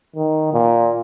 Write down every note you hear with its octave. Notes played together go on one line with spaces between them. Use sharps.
D#3
A#2